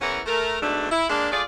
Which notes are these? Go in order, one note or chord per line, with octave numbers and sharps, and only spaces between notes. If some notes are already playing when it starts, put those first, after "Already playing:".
E2 E3 C#4 A#4 F#5
A3 A#4
G#2 B2 A3 D4
E4
G#3 A#3 D4
A3 F4 G#4 D5